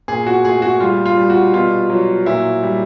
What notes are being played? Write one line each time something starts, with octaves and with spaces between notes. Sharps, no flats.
A#2 G#4
F#4
A3 G#4
F#4
G3 F4
F4
G3
F#4
B2 F4
F#3
A#2 E4
G3